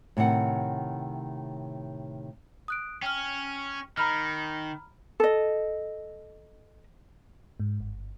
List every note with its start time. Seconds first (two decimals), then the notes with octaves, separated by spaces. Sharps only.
0.17 A2 C3 D#3 F#5
2.68 D#6 F#6 D7
3.02 C#4 G5 F6
3.97 D#3 A#5 B5 F6
5.20 A4 D#5
7.60 G#2
7.80 G1